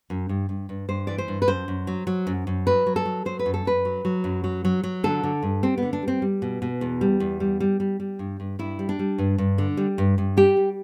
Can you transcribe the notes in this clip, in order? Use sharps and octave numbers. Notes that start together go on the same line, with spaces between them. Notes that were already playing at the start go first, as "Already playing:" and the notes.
F#2
G2
G2
G2
G2 C5
E3 D5
C5
G2
B4
F#2 C5
F#2
F#3
F#3
F#2
F#2
F#3 B4
F#3
A4
F#3
F#3 C5
B4
F#2
A4
F#2 B4
F#3
F#3
F#2
F#3
F#3
F#3
D3 A4
D3
G2
G3 C4
D3 B3
D4
G3
C4
G3
B2
B2
E2
G3
E2
G3
G3
G3
G3
G2
G2
G2 E4
G3
D4
G3
G2
G2
D3
G3
G2
G2
G3 G4
G3